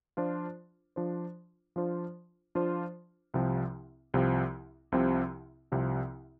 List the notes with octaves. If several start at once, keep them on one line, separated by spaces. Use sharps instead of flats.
F3 D4 F4 C5
F3 D4 F4 C5
F3 D4 F4 C5
F3 D4 F4 C5
C2 C3 F3 C4
C2 C3 F3 C4
C2 C3 F3 C4
C2 C3 F3 C4